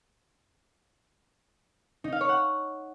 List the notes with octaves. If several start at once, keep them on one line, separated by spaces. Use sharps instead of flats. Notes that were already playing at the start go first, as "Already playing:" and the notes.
D#4
F5
C#5
F#5